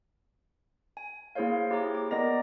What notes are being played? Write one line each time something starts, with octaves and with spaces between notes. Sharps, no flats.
G#5
A#3 E4 G#4 C5 C#5 F5
E4 G4 G#4 C#5 A#5 D6
D6
B3 A#4 D5 D#5 A#5 A#6